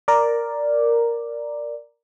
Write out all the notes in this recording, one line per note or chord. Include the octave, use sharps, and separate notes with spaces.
A#4 D5